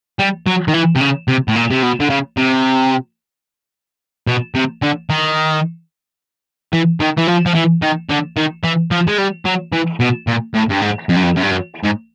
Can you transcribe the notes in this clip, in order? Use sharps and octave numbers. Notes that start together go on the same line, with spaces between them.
G3
F#3
D#3
E3
C3
C#3
C3
A2
A#2
C3
B2
D3
C#3
C3
B2
C3
D3
D#3
E3
D#3
E3
F3
F3
E3
D#3
D3
D#3
E3
F3
G#3
G3
F#3
E3
B2
A#2
A2
G2
G#2
F2
F#2
F2
F#2
G2
F#2
G#2